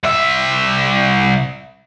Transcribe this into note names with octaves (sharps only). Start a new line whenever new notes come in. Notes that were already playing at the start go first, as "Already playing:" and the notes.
C2 E5